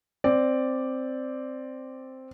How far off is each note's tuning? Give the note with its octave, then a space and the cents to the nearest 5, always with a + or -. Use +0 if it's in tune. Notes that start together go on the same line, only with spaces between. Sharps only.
C4 +0 D5 +0